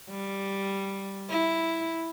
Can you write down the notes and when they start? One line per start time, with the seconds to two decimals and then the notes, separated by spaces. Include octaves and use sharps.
0.10 G3
1.30 E4